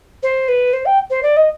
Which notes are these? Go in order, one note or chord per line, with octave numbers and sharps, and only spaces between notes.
C5
B4
C5
G5
C5
D5
D#5